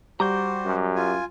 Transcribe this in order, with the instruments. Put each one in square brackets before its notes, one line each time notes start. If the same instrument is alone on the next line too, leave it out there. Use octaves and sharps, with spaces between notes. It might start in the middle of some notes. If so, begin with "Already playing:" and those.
[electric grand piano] G3 [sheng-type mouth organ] F#4 C5 [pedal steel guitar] A#5 D6 G6
[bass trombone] F#2
[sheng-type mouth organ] F4 G#5